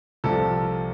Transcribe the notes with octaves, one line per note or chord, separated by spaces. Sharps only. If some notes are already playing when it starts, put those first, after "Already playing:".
C2 C3 F3 A4